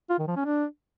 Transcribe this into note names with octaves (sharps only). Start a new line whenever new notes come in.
F4
D#3
F3
C#4
D4